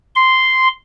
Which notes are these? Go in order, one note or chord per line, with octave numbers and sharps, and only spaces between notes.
C6